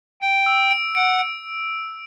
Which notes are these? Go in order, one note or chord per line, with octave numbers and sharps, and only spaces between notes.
G5 D7
E6
D7
F#5 D7
D7